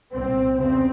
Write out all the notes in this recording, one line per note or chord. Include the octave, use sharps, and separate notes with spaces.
C2 A#2 C4
E2 C#3 C4